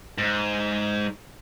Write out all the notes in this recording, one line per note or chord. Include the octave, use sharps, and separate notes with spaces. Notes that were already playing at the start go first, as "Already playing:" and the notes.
G#2